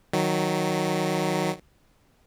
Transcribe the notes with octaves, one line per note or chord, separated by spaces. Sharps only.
D#3 F#3